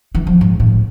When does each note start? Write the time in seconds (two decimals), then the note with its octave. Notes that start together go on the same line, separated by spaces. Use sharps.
0.15 E3
0.27 F3
0.41 G#2
0.60 A2